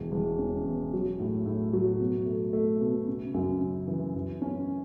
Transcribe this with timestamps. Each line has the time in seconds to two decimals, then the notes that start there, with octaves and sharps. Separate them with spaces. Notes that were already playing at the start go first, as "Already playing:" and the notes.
Already playing: E1
0.12 E1
0.39 C#4
0.65 E2
0.93 F#3
1.19 A2
1.46 A2
1.73 F#3
2.00 B2
2.26 A3
2.53 A3
2.81 B2
3.08 C#3
3.34 F#2
3.61 C#3
3.87 E3
4.15 F#2
4.42 C#4